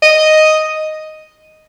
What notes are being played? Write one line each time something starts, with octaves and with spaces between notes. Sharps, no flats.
D#5